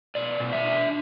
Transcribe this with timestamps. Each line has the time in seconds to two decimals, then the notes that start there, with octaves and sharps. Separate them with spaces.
0.15 B2 D5
0.40 B2
0.53 E5
0.65 D4